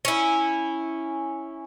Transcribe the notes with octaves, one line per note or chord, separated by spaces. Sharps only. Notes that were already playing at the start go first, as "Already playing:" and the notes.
C#4 E4